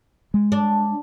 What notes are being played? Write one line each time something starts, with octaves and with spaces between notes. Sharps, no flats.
G#3
D4